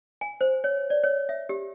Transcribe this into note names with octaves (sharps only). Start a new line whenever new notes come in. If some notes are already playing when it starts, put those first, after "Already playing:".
G#5
C5
C#5
D5
C#5
E5
G4